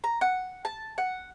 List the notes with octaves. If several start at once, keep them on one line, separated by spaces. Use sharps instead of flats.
A#5
F#5
A5
F#5